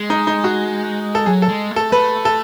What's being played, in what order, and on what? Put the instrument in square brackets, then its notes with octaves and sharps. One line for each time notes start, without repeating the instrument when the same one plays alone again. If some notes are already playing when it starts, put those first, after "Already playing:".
Already playing: [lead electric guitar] G#3
[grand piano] D#4
D#4
F#4
A4
[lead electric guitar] F#3 [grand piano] G#4
[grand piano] A4
[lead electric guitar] G#3
A3
[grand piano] A4
[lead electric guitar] A3 [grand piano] B4
[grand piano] A4